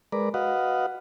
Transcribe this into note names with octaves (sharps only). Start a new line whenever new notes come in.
G#3 A#4 B4 D5
F#4 B4 D#5 F5 F#5